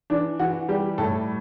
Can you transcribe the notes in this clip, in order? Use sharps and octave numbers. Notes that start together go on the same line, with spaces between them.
E3 D4
E3 F#4
G3 G4
A2 A4